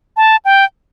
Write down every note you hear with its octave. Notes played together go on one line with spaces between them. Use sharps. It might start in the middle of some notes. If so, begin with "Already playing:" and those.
A5
G5